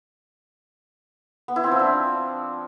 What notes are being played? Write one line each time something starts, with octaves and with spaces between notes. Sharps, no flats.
B3
E4
C4
F3
D4